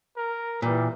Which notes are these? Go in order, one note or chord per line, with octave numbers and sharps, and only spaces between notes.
A#4
A#2 E3 G3